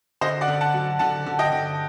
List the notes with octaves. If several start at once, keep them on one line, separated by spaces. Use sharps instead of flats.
D3 C5 D#5
D5 F#5
D3
F#5 A5
F#3
D3 F#5 A5
D3
D#5 G5
D3